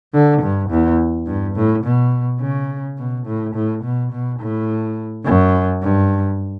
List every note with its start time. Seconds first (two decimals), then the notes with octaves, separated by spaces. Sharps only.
0.14 D3
0.42 G2
0.70 E2
1.27 G2
1.56 A2
1.84 B2
2.40 C#3
2.98 B2
3.26 A2
3.55 A2
3.83 B2
4.12 B2
4.40 A2
5.25 F#2
5.82 G2